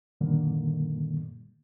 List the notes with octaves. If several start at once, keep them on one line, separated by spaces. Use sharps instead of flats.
F#2 A#2 D3 D#3 G3 A#3